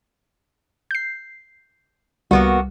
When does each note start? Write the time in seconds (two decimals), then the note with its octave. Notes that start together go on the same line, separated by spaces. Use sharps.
0.91 G6 C7
2.31 C2 G3 A#3 B3 F#4